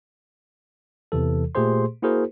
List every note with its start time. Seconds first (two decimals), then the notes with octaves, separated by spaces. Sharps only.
1.12 E2 C3 E3 A4
1.55 A#2 A3 G4 G#4 C5 C6
2.02 A#3 E4 F#4 G#4 A#4 C5